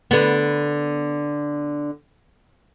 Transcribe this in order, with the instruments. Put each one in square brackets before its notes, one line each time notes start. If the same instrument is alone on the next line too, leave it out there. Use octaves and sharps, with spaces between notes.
[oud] D3 B3